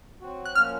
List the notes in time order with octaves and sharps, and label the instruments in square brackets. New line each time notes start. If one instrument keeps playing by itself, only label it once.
[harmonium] F#3 C4 F#4
[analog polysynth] F#6
[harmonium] A#2 F3 A#3 C#4 F#4 [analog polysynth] F6